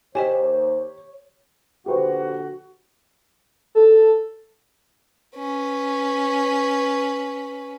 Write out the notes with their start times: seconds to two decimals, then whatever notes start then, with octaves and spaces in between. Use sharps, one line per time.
0.15 D#2 G4 C5 C#5 D#5 G5 G#5
1.86 A#1 D3 F#4 G4 B4 C5
3.75 A4
5.36 C#4 B4